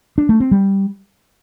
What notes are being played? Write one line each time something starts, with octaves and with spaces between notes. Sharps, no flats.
D4
A3
C4
G3